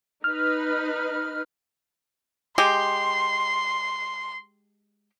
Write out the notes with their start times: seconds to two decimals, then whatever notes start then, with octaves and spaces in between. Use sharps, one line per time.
0.24 D#4 B4 F6
2.58 G#3 G4 C6